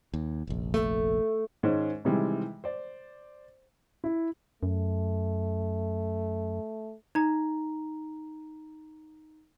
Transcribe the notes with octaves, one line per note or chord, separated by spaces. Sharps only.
D#2
F1 A#1
A3
G#2 D#3 G#3 C#4 C5
C3 D#3 E3 G3 G#3
C5 D5
E4
F#2 A3
D#4 A#5